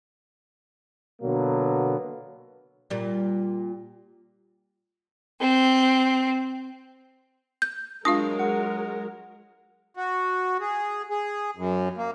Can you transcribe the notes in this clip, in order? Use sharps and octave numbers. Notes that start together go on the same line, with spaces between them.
B2 D3 F#3 A#3 B3
A#2 G3
C4
G6
F#3 G#3 D4 F4 A#4 F5 D#6
F#5
F#4
G#4
G#4
F#2
A#3